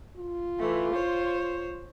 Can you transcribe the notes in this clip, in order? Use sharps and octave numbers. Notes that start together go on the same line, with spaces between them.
F4
E3 A3
C5 C#5